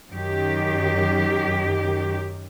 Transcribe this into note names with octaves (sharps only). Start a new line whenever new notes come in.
F#2 D#3 G4